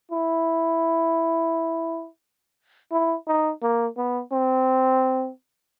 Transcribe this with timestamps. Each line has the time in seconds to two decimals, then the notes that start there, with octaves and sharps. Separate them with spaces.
0.11 E4
2.92 E4
3.27 D#4
3.62 A#3
3.97 B3
4.32 C4